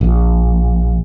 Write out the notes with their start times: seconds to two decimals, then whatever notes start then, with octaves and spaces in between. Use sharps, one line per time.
0.01 A#1